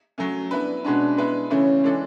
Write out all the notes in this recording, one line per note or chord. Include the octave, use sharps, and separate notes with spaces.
F#3 A3 C#4
B3 D4 E4 B4
B2 G#3 C#4 D4 F#4 B4
G#3 B3 E4 B4
C#3 E3 A3 C#4 E4
E3 G#3 D4 A4 D5